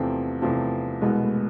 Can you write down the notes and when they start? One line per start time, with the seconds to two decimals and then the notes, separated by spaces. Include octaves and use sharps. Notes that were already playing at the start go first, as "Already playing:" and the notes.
Already playing: E2 C3 F3 A3 C4
0.42 E2 C3 F3 A3 C4
1.01 C2 B2 G#3 B3
1.22 A3